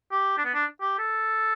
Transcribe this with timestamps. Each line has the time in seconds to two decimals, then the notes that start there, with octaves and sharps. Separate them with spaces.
0.12 G4
0.38 D4
0.45 B3
0.54 D4
0.81 G4
0.99 A4